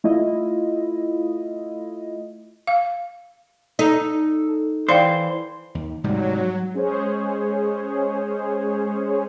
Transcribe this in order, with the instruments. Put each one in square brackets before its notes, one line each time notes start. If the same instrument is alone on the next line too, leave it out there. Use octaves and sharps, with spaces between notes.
[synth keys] A3 E4 F4 D#5
[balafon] F5
[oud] D#4 [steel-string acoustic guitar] A4
[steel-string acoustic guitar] E3 [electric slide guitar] C5 [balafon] D5 F5 G5
[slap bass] D#2
[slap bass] G#2 C3 G3 [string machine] F#3
[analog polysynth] G#3 C#4 G#4 C5 C#5